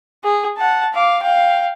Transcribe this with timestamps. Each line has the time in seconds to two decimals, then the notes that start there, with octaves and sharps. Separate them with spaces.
0.24 G#4
0.58 F#5 A5
0.93 F5 D6
1.23 F5 G5